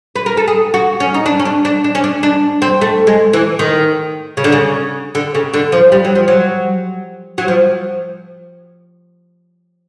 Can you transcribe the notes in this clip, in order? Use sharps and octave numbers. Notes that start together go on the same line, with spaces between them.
B4
A#4
A4
G#4
F#4
C#4
D#4
D4
C#4
D4
D4
D4
C#4
D4
D4
C4
A3
G#3
E3
D#3
C#3
D3
C#3
D3
C#3
D3
F3
G3
F#3
F3
F#3
F#3
F3